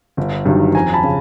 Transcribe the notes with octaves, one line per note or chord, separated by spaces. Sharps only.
G1
G2 D#3 F#3
F2 G#5 A#5
A5 B5
C#3